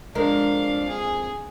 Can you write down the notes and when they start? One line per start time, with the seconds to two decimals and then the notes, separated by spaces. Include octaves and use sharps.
0.15 F2 G#3 D4 A#4 F5
0.88 G#4